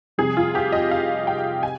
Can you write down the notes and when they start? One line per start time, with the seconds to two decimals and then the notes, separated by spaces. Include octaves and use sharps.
0.18 F1 F2 C3 G3 G#4
0.37 F4
0.55 G4
0.72 D#5
0.91 F5
1.27 G5
1.63 G#5